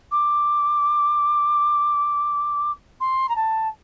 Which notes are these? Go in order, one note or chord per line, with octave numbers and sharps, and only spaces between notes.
D6
C6
A#5
A5